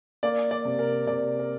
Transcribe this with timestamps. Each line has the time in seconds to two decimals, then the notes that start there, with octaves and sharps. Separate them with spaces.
0.23 A#3 D5
0.51 D5
0.65 C3
0.79 A#4
1.07 C3 D5
1.39 A#4